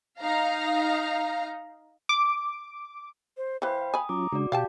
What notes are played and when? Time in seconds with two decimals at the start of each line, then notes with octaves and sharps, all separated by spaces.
0.21 D#4 F5 A#5
2.09 D6
3.37 C5
3.62 E3 B4 C5 F5 G5 B5
3.94 G#5 B5 D#6
4.09 F#3 C#4 F4 A#5 D6
4.32 C#3 G#3 D4 F#4 D5
4.52 B2 G4 F5 G5 A5